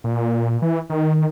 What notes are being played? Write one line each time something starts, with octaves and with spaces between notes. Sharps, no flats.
A#2
E3
D#3